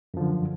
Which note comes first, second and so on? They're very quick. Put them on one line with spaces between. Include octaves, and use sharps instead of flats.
F#2 F3 D3